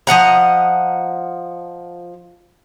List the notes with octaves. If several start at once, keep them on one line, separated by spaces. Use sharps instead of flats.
F3 D#5 F#5 A#5